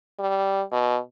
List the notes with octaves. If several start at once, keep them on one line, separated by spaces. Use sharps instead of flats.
G3
B2